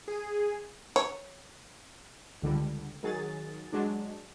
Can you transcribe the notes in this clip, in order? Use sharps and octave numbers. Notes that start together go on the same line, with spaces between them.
G#4
C#5
C#2 D3 G3
D#3 F#3 G#4 A6
F#3 G#3 D4